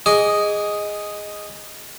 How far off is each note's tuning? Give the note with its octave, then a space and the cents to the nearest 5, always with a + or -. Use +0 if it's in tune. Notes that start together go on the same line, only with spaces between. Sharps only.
G#4 -5 D#5 +0 D6 -35